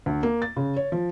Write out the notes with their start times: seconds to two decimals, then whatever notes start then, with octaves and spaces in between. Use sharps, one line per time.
0.06 D2
0.23 A#3
0.42 A6
0.57 C#3
0.76 C#5
0.92 F3